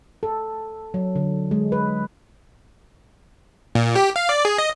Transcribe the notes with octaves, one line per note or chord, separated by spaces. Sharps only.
A4
F#3
D3
G#3
B4
A#2
G4
F5
D5
G#4
D#5